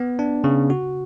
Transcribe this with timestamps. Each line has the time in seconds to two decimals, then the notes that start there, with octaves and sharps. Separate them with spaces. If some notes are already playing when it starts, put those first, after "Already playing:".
Already playing: B3
0.19 D4
0.44 C#3
0.70 F#4